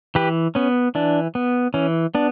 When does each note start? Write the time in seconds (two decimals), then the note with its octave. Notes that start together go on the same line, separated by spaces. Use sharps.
0.15 E3 G4 B4
0.55 B3 C#4
0.95 E3 D4
1.35 B3
1.74 E3 C#4
2.15 B3 D4